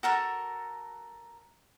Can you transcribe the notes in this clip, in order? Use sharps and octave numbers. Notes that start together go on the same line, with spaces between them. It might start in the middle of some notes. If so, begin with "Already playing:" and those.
F#4 A4 A#4 A5